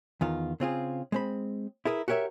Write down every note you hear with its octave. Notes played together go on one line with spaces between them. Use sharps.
E2 D#3 F4
C#3 C4 F4 G#4
G#3 C4 B5
E4 G#4 A#4 B4
F#4 G4 A#4 C#5 E5